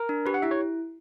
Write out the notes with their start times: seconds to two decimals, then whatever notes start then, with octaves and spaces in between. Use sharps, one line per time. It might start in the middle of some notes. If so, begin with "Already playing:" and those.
Already playing: A#4
0.09 D4
0.26 G4 B4
0.34 F#5
0.42 E4 E5
0.51 C#5